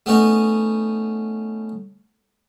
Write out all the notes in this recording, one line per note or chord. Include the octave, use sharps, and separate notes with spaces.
A3 B3 C#4 D#4